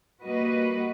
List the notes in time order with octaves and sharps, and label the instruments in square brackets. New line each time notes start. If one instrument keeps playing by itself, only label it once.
[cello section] G3 A#3 F#4 B4 D#5